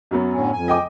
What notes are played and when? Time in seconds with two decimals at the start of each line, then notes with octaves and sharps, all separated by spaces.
0.11 F#2 F#3 B3
0.33 A2 D3 C#4
0.53 F2 G#5
0.68 D#5 G5 D6